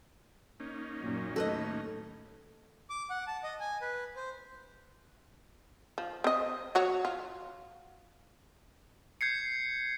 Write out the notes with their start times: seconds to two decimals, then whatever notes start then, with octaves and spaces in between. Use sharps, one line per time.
0.60 A#3 C#4 D#4
1.00 F#2 A#2 F#3
1.36 D#2 A2 A4 B4 D#5
2.90 D6
3.10 F#5
3.27 A5
3.44 D#5
3.60 G#5
3.82 B4
4.16 C5
5.98 F3
6.24 C4 D#5
6.75 F#3 F#4 C#5
7.05 F4
9.21 G6 G#6 C7 C#7